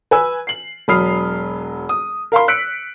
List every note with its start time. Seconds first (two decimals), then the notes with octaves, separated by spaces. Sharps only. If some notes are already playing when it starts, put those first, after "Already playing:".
0.11 B4 G#5 E6
0.47 C7 F#7
0.88 E1 F#3 B5 D#6 F6 C7
1.89 D#6
2.32 A#4 F5 B5 C6
2.48 E6 F#6 B6 C#7 D7